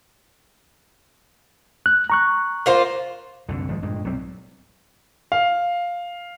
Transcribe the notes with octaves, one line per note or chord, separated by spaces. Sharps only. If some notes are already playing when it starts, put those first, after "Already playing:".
F#6
A#5 C#6 F#6
A#3 F4 C5
C2 F#2 D3
G#1 F3 G#3
G2 A#2 G#3
B1 F#3 G3 C4
F5